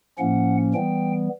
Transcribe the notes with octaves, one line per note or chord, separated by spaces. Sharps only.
A2 F3 A#3 C#4 F#5
E3 G3 B3 G5